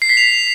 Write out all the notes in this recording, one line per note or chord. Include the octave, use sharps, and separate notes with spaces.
C7
B6
F7